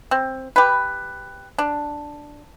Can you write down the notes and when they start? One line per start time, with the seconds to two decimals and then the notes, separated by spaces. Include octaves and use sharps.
0.11 C4
0.56 G4 B4
1.58 D4